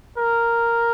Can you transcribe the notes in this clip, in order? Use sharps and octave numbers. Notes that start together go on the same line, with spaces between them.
A#4